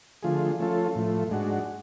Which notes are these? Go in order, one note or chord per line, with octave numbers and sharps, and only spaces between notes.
D3 F3 A3 F4 G#4
F3 A3 C#4 F4 A4
A2 F3 A3
G#2 G#3 D4 F#4